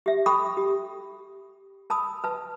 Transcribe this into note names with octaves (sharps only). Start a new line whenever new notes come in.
G4 E5
A4 G5 B5 C#6 D#6
G4
A#4 A5 B5 D#6
B4 A5